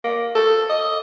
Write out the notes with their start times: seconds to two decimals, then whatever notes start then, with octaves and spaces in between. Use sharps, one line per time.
0.04 A#3
0.35 A4
0.69 D#5